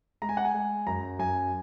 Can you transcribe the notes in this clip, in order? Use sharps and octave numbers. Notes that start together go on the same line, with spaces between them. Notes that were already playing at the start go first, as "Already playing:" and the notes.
G#3 A#5
G#5
F#5
G#5
G#3
F#2 A#5
F#2 G#5